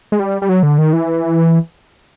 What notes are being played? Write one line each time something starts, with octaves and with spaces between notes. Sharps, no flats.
G#3
G3
G3
F#3
D3
D#3
E3